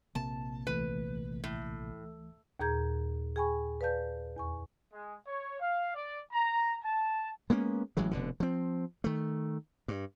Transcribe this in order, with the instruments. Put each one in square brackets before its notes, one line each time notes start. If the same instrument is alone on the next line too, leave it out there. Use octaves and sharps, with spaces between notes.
[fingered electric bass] A#1 C3 A#3 [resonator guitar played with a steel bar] A5
[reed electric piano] C#2 E3 A3 [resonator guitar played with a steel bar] B4
[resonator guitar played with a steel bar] A2
[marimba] D#2 A#2 G#4 A#5 G6 G#6
G#4 G5 G#5 B5 C#6
B4 D5 F5 A5 G6
E2 G#5 C#6
[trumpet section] G#3
C#5
F5
D5
A#5
A5
[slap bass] G#3 A#3 B3 C#4
A1 E3 F#3 G#3
F1 B2 D3
F3 C4
D#3 A3
G2